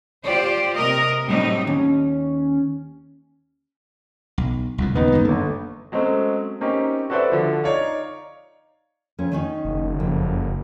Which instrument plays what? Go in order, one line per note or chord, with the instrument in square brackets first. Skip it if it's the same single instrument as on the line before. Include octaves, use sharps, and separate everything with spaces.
[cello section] F4 G4 C5 D5
C3 A#4 D#5
A2 F#3 G3 C4 D#4
[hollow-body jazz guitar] D#2 [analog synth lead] C#4
[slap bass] B1
C2 F2 A2
[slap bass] D#2 C#3 [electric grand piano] B3 D#4
[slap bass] F#2 D#3 G#3
[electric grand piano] G1 A4 [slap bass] A#3
[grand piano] F#3 G#3 A3 C4 C#4
A#3 C4 C#4 D#4 G4
F#4 A4 B4 C5 D5 E5
D3 F3
D#4 C#5 D5 F5
[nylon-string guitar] F2 C#4
D#3 C#4 D#4
[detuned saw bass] F#1
[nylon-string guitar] F2